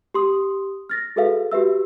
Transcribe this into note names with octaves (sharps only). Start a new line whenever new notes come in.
G4 C6 D#6
F6 A6 A#6
F#4 G#4 A4 B4 E5 F5
F#4 G4 B4 E5 E6